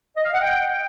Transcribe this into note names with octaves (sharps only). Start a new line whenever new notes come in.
D#5
F5
F#5
G5